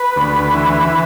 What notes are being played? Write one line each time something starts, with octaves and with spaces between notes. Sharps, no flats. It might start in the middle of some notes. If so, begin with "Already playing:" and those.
Already playing: B4
D2
E3